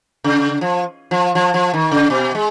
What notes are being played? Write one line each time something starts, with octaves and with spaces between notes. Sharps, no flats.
C#3
F3
F3
F3
F3
D#3
C#3
B2
G#3